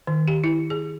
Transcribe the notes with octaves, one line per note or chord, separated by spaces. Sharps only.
D#3
G4
E4
G#4